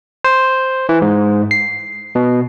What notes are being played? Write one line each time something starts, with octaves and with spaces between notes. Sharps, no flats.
C5
E3
G#2
C7
B2